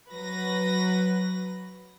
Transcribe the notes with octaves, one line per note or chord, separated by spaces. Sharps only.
F#3 B4 A#6